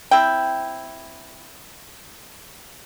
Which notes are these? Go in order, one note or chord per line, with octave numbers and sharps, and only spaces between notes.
C4 E4 G5